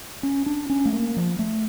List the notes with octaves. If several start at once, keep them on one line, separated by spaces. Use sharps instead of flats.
C#4
D4
C#4
A3
A#3
F3
A3